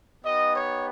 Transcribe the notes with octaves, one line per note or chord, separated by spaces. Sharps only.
B3 D#4 G4 D#5
C#5